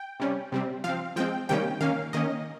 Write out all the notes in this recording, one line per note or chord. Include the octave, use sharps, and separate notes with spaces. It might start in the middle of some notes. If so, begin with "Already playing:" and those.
Already playing: G5
C3 G3 C#4
C3 G3 C4
F3 C4 F5
F3 G#3 C4 G5
C3 D#3 G3 A#3 C#4 G5
D#3 A#3 C#4 F5
D#3 A#3 C#4 D#5